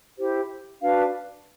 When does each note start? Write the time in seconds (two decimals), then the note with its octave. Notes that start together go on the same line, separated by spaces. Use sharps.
0.18 E4 G4 C5
0.81 D4 F#4 B4 F5